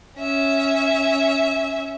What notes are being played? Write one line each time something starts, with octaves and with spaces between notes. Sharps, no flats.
C#4 E5